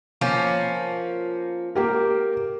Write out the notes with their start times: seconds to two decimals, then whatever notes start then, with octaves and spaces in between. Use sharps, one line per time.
0.21 F3 A#3 C#4
1.75 A#3 G4 A#4